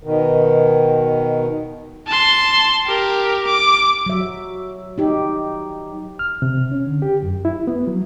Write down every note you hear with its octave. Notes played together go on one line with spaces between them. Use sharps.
B2 D#3
A5 C6
G4 A#4
D6
F#3 E5
D#4 G4
F6
C3
C#4
D3
G4
F#2
E4
B3
F#3